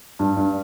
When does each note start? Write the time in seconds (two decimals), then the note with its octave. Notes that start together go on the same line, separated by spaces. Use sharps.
0.19 G2
0.37 G2